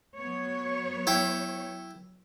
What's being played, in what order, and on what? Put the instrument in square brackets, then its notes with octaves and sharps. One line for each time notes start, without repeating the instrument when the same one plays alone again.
[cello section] F#3 B3 C#5
[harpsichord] E4 G5